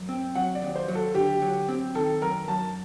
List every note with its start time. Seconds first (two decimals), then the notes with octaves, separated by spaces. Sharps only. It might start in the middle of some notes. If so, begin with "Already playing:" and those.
Already playing: F#2
0.09 C4
0.35 F#3 F#5
0.55 D5
0.62 D#2
0.76 C5
0.88 F#3
0.95 A4
1.14 D3 G4
1.42 F#3
1.68 C4
1.95 D#3 A4
2.22 F#2 A#4
2.48 F#2 A5